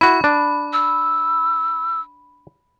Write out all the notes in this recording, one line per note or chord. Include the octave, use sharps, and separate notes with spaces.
E4 F#4 B5
D4
E6